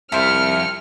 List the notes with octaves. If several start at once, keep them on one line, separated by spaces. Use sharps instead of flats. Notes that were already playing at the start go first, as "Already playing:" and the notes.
C2 F2 E4 C5 F6 C#7